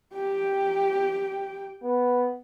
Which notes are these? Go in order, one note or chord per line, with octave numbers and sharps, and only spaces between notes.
G4 G5
B3